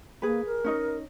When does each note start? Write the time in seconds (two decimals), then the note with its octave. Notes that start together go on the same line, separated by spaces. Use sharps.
0.22 A#3 G#4 B4
0.46 A#4
0.64 C#4 D#4 D#5